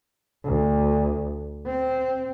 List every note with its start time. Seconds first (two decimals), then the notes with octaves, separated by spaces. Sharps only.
0.44 D2
1.66 C4